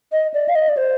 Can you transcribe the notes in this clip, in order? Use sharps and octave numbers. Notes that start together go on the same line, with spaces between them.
D#5
D5
F5
D#5
D5
C5